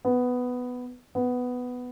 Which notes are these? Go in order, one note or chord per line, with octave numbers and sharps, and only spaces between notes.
B3
B3